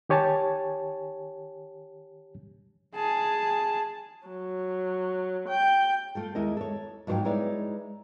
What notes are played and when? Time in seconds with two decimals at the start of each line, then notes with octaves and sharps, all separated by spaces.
0.09 D#3 G4 C#5 G#5 A5
2.95 G#4 A5
4.27 F#3
5.49 G5
6.15 A3 F4 A4
6.35 D#2 G#3 E4 A#4 D#5
6.57 A4 C#5
7.07 G#2 F3 F#3 C5 C#5 G5
7.24 G#3 D#4 E4 B4 C#5 D5